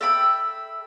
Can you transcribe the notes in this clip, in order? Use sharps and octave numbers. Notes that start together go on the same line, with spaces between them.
A4 E5 G5 B5